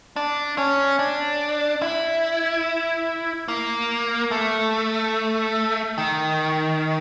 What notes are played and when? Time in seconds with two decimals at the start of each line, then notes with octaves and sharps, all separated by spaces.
0.16 D4
0.58 C#4
0.99 D4
1.82 E4
3.48 A#3
4.31 A3
5.98 D#3